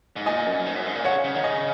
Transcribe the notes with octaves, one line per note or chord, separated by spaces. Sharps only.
G#2
A#2 D#5 G#5
F#2
G#2
F#2
G#2
A#2
C#3 C#5 F#5
C#3
D#3
C#3 D#5